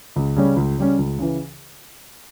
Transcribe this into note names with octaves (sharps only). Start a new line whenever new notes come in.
C#2
C#3 G3 C#4
C#2
C#3 G3 C#4
C#2
C#3 E3